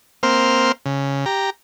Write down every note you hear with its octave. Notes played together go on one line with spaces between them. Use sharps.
A#3 C4 C5 F6
C#3
G4 A#5